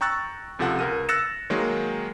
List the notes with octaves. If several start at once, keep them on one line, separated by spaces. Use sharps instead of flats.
G5 A#5 C#6 E6 F#6 A6
C#2 C3 F3 A4 F#5
C#2 A#4 D#7
E6 F#6 A6 A#6 C#7 E7
D#3 F#3 G#3 A#3